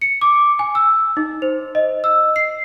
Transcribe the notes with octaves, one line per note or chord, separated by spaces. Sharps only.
C#7
D6
G#5
E6
D#4
C5
D#5
E6
C7